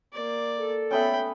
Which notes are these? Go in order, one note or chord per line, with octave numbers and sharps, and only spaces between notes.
A#3 D5
A4
A3 B3 C#4 G5 B5